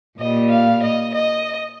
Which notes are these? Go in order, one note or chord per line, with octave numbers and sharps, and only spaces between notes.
A#2 G3 D#5
F5
D#5
D#5